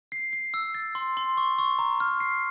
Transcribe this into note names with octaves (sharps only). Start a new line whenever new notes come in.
C7
C7
E6
A6
C6
C6
C#6
C#6
A#5
F6
C7